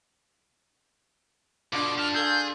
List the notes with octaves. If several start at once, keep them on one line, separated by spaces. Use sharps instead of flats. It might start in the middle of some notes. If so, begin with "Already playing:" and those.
B2 D3 F4 D6
G4 A5 F6
F4 G#4 A4 G6